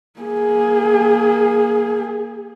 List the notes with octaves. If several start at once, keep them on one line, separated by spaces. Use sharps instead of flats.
A#3 G#4